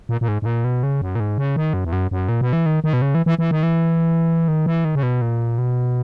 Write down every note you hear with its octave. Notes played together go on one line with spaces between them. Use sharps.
A#2
A#2
G#2
G#2
A#2
B2
C#3
F#2
A#2
G#2
C#3
D#3
F#2
E2
F#2
F#2
A#2
B2
E3
D#3
D#3
B2
C#3
E3
E3
E3
D#3
E3
D#3
E3
D#3
C#3
B2
A#2
B2